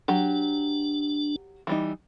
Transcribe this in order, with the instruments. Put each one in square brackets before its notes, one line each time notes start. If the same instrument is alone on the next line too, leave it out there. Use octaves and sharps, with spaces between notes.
[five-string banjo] F#3 G4 [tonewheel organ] D4
[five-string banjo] E3 G3 D#4